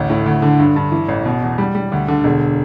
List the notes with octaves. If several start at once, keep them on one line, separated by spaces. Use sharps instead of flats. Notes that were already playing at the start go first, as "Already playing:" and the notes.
Already playing: A1 D2
A2
D2
D3
G2
G2
E3
A1
B2
E2
G3
G3
D2
D3
E1